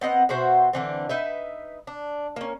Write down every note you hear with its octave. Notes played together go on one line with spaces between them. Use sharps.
B3 C4 D#5 F#5
B2 F#4 C5 E5
D3 E3 C4
D#4 B4 E5
D4
A#3 C#4